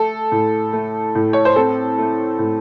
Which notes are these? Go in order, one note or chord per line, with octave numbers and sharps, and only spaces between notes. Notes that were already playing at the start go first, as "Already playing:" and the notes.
Already playing: A3 A4
A2
A3
A2
C#5
C5
C4 A4
A3
A2